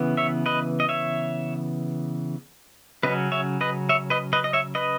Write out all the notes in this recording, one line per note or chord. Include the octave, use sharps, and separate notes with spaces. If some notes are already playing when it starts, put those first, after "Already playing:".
Already playing: C#3 E3 B3
C#5 E5
B4 D#5
D#5
C#5 E5
C#3 F#3 C#4 B4 D#5
C#5 E5
B4 D#5
C#5 E5
B4 D#5
B4 D#5
D#5
C#5 E5
B4 D#5